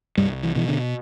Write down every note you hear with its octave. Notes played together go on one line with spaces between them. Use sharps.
C2 G2 G3
E3
B2 E3
D3